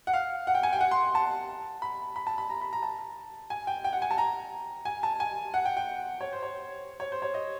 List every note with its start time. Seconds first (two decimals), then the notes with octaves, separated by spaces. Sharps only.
0.07 F#5
0.14 F5
0.47 F#5
0.55 G5
0.63 G#5
0.73 G5
0.81 F#5
0.91 C6
1.15 A5
1.82 B5
2.16 B5
2.27 A5
2.38 B5
2.50 A#5
2.61 B5
2.73 A#5
2.83 A5
3.50 G#5
3.67 G5
3.84 G5
3.93 F#5
4.02 G#5
4.11 A5
4.18 A#5
4.85 G#5
5.03 A5
5.20 G#5
5.54 F#5
5.65 G5
5.77 G5
6.21 C#5
6.33 C5
6.43 C#5
7.00 C#5
7.12 C5
7.22 C#5
7.34 D#5